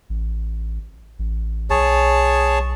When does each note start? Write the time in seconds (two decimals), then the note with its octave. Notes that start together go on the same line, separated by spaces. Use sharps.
0.09 A1
1.19 A1
1.70 B1 G#4 C#5 A5